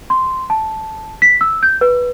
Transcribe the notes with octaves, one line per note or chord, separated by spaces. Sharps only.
C6
A5
B6
E6
G6
B4